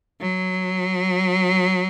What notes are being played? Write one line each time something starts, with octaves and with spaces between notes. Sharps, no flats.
F#3